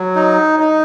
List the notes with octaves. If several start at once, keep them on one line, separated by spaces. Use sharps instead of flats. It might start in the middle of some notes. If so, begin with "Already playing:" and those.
Already playing: F#3
D#4
D#4